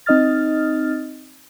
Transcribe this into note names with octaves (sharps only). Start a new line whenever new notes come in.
C4 D#4 D#5 D#6 F6 A6